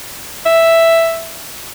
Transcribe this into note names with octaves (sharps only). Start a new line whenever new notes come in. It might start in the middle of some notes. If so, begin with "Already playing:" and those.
E5